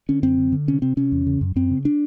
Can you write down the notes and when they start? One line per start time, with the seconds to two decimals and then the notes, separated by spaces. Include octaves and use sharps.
0.09 D3 C#4
0.23 F#2 C4
0.38 D3
0.52 D3
0.68 C3 C#4
0.82 C3 C4
0.97 C3 C#4
1.12 E2
1.27 C#3
1.41 F#2
1.56 F#2 C4
1.70 C#3
1.85 D4